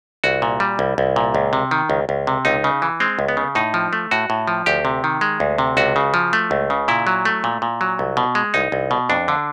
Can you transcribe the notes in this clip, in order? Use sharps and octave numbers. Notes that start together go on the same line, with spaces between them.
C2 F#4
A#2
G3
C2
C2
A#2
C#2
C3
D#3
C#2
C#2
C3
C#2 D#4
C#3
E3
G#3 C4
C#2
B3
C#3
A2 D#4
F3
A3
A2 F#4
A2
F3
D2 G4
C3
D#3
G#3
D2
C3
C#2 F#4
C#3
F3
A3
C#2
C#3
A#2 E4
F#3
A3
A#2
A#2
F#3
C2
B2
G#3
C2 D#4
C2
B2
F2 D4
D3